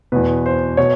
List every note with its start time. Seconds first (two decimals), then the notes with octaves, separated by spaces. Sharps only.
0.12 E2 B2 B4
0.46 C5
0.77 B2 C#5